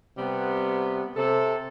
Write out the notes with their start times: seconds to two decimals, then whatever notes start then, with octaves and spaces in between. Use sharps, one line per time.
0.18 C3 G3 B3
1.16 C3 A4